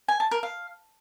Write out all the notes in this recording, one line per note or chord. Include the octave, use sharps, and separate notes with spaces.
G#5
A5
A#4
F5